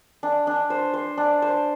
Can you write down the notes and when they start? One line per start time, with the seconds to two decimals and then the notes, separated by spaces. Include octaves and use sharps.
0.23 D4
0.47 D4
0.70 C5
0.94 C5
1.17 D4
1.42 C5